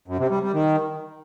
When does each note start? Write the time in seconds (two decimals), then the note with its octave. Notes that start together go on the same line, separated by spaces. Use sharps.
0.08 F#2
0.19 C3
0.31 G3
0.42 G3
0.54 D#3